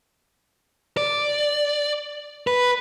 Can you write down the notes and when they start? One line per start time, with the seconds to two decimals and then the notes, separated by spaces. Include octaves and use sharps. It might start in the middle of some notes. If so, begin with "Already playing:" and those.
0.97 D5
2.47 B4